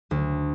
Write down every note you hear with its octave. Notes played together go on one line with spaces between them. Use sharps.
D2